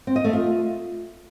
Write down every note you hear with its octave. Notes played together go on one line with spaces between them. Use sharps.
C4
D#5
A3
F4